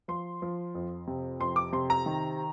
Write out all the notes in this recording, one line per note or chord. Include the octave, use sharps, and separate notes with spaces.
F3 C6
F3
F2
C3
F2 C6
D6
C3 C6
A#5
D#3